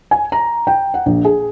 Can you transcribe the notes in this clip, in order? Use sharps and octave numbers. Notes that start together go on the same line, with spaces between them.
G#5
A#5
G5
F#5
A#1
G#4